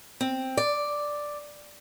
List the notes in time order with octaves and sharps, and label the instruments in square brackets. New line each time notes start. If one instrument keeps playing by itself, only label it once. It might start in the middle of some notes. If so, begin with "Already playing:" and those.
[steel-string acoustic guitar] C4
D5